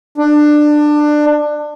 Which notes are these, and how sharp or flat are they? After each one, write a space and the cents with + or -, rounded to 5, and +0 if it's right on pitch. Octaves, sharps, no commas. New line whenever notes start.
D4 +20